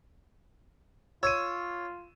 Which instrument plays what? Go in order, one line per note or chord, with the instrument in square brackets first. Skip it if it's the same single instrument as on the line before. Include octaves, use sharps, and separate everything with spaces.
[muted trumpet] F4 [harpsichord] C#5 [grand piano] E6 D#7